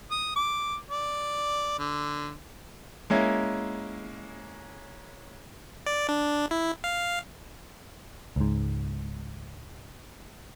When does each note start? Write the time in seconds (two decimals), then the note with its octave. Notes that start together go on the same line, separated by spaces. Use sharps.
0.11 D#6
0.36 D6
0.91 D5
1.79 D3
3.10 G#3 A#3 C#4 E4
5.86 D5
6.09 D4
6.51 E4
6.84 F5
8.36 C#2 G#2